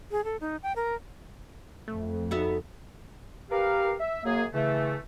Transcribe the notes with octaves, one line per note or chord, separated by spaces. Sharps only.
G#4
A4
D#4
G5
A#4
F2 A3
B3 D#4 F#4 A4 E5
G4 A#4 B4 F5
E5
F#2 A#3 G#4
C#3 E3 A3